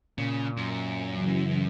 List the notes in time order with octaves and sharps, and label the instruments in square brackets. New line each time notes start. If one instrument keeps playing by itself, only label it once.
[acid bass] A#2 [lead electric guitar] C#3
[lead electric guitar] F#2
[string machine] C#3 E3 F#3